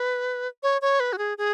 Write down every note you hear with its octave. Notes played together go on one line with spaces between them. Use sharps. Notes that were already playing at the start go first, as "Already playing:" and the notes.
Already playing: B4
C#5
C#5
B4
F#4
G#4
G#4